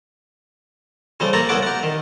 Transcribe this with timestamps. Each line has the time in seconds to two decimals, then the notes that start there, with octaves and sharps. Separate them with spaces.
1.20 C#3 F3 G3 A3 C4
1.33 A#3 C4 A4 A#5 B5 C#6
1.49 C2 B3 C#4 A4 F#5 D6
1.63 G4 F#5
1.83 D#3